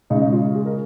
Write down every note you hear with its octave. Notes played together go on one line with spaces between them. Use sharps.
C#3 G#3 D#4
D#4
F4
G#4
A#4